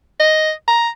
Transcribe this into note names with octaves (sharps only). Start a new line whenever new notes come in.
D#5
A#5